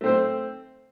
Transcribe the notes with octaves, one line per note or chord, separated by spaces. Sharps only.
A3 C4 C5